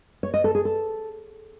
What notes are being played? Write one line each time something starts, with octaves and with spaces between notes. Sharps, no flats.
C#5
D#5
A4
G#4
A4